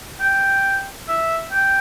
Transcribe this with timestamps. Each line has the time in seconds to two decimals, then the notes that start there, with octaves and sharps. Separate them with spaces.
0.20 G5
1.09 E5
1.52 G5